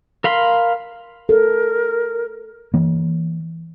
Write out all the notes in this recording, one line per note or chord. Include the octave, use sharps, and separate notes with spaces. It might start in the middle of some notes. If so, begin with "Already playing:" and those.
A#4 F5 B5 C6
A4 A#4
E3 A#3